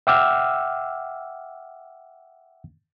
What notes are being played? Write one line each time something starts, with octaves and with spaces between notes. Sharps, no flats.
E5 F#5 G5 D6 E6 F6